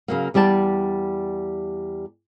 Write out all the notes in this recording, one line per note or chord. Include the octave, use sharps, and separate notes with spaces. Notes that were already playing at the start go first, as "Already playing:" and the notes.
C#3 F#3 A#3
E2 G3 G4 D5 A5